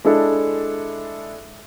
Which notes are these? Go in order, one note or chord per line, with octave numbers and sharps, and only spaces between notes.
G#3 D4 E4 A4